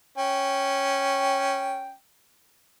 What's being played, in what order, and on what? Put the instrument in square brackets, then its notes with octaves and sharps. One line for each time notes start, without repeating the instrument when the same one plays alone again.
[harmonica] C#4 G5